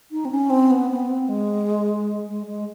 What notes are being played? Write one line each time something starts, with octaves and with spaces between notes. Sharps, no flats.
D#4
C4
C#4
C4
B3
B3
C4
G#3
G#3
G#3